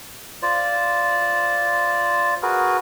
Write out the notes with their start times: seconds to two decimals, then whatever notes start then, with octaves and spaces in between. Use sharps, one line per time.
0.42 F4 C5 D5
2.42 F#4 G#4 A#4 B4